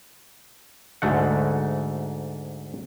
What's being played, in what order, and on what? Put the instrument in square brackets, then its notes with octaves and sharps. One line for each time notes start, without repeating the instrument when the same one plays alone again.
[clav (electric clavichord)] D2 G#2 A3 F#5